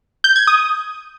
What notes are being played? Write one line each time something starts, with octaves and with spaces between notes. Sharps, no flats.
G6
G#6
D#6